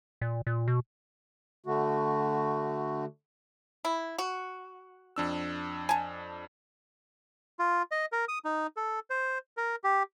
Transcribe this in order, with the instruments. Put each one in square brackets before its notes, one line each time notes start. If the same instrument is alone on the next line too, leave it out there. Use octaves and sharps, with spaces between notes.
[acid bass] A#2
A#2
B2
[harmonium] D3 A3 F#4
[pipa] E4
F#4
[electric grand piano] F2 D4 E6
[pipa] G#5 A5
[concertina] F4
D#5
A#4
D#6
D#4
A4
C5
A#4
G4